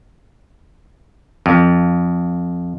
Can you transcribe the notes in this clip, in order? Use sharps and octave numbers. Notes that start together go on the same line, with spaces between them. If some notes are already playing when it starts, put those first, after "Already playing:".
F2